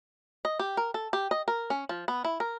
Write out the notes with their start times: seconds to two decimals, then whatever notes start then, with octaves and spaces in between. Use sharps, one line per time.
0.45 D#5
0.59 G4
0.77 A#4
0.94 A4
1.13 G4
1.31 D#5
1.48 A#4
1.70 C#4
1.89 F3
2.08 B3
2.25 E4
2.40 A#4